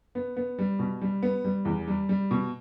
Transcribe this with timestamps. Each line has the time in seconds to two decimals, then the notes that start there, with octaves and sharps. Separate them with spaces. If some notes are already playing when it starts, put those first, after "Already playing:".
0.15 B3
0.37 B3
0.59 G3
0.79 B2
1.02 G3
1.23 B3
1.45 G3
1.65 E2
1.88 G3
2.09 G3
2.31 B2